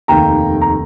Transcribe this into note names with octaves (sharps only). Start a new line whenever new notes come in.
F1 D#2 D#3 G5 A#5
A#5